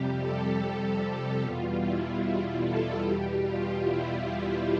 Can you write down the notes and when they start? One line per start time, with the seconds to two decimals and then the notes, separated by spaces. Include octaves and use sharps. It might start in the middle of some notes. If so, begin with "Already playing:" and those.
Already playing: F2 C3 G3 G4
0.20 A4
0.61 G4
1.42 E2 B2 G3 F4
1.82 E4
2.63 A4
3.03 E2 B2 G3 G4
3.44 F4
3.84 E4
4.24 E4